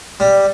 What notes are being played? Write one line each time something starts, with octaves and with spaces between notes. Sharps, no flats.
G3